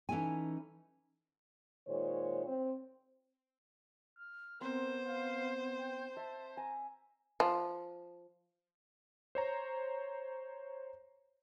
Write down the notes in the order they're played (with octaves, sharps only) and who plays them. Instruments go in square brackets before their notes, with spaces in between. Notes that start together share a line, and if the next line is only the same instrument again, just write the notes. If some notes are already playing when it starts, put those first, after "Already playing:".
[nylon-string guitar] E3 C#4 D#4 E4 A4 G#5
[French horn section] A#2 D#3 G#3 C5 C#5
C4
[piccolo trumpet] F6
[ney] B3 [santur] C4 [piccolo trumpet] A#4 [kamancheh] C5
[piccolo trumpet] F5
G5
[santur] E5 [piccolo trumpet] A5
[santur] G#5 [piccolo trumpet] A#5
[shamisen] F3
[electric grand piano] C5 C#5 A#5